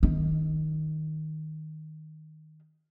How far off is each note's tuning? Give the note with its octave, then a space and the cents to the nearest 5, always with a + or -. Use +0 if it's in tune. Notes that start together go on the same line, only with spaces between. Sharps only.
D#3 +0 D#4 +20